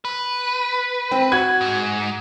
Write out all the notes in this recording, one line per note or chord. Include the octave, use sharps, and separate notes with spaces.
B4
C4
F#4 G#6
G#2